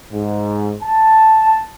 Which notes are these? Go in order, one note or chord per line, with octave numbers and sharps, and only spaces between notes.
G#2
A5